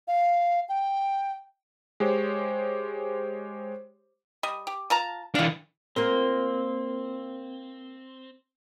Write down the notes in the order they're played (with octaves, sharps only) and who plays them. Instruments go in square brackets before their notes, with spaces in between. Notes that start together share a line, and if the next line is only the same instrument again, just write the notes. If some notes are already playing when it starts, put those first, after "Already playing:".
[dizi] F5
G5
[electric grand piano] G#3 G4 C5 C#5
[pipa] G3 D#5
G4
F4 A5 A#5
[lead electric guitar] E3 D4 [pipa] F4 F5
[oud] A#3 F4 A#4 [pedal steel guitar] C4